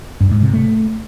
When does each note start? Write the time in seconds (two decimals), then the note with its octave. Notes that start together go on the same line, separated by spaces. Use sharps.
0.21 G2
0.32 G#2
0.43 C3
0.54 A3